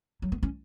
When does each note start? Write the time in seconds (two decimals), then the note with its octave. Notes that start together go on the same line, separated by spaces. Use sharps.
0.22 F#3
0.32 B3
0.43 C#4